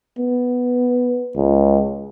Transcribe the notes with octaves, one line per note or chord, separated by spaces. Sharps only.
B3
C#2